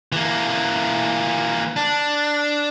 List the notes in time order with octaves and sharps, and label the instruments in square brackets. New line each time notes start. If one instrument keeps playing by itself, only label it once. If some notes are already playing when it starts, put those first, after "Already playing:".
[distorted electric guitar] E3 A#3
D4